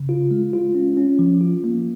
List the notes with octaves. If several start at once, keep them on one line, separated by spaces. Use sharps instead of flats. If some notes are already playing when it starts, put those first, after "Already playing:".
Already playing: C#3
F4
G#3
F4
C#4
C#4
F3
F4
A#3